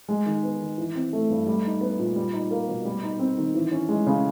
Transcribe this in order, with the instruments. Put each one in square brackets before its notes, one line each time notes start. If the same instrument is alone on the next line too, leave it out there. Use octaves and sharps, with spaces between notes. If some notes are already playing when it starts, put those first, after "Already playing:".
[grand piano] G#3
D#3
B3
D#3
E3
C4
A3
G2
G3
D#4
B3
A#2
G3
D#4
A#3
B2
G3
D#4
C4
D#3
E3
C#4
G#3
C#3